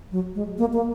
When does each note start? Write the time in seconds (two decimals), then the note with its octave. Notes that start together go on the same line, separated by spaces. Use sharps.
0.11 F#3
0.35 G#3
0.58 A#3
0.73 A#3